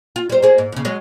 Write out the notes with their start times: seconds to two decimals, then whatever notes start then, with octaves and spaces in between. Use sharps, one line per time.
0.16 F4
0.30 G3 C5
0.43 A#3 G#4
0.58 G#2
0.72 D#2 C#3
0.85 F#3 G#3 C#5